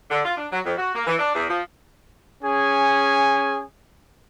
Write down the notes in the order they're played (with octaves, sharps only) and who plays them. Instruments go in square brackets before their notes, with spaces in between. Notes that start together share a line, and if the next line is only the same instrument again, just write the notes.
[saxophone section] D3
F4
D4
F#3
F2
F#4
A#3
E3
D4
E2
F3
[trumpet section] C#4 G#4 G#5